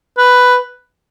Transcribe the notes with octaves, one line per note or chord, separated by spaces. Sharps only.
B4